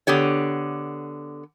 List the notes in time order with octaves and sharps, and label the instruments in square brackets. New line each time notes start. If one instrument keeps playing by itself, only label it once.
[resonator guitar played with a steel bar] D3 B3 G4 C#5